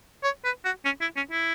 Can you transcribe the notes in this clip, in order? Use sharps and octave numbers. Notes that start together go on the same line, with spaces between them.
C#5
B4
F#4
C#4
E4
C#4
E4